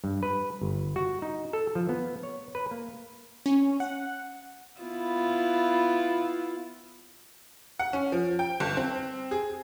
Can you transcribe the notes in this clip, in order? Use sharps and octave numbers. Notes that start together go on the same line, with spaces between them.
G2
B4
G1
F#4
D#4
A4
F3
B3
C#5
B4
A#3
C#4
F#5
B3 E4 F4
F#5
C#4
F3
G5
G1
C4
G#4